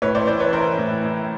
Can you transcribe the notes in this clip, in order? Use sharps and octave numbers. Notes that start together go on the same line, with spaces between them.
A2 B4 C#5
C5 D5
E3 C5 D5
B4 C#5
E3 A#4 C5
A2
A2